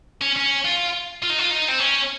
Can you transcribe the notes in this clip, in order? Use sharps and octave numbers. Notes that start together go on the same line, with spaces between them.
C#4
C#4
F4
F4
D#4
F4
D#4
C4
C#4